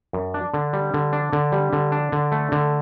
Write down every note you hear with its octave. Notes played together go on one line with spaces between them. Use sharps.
F#2
D4
D3
G3
D3
D4
D3
G3
D3
D4
D3
A3
D3